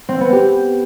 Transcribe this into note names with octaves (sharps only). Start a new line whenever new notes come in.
C4
B3
G4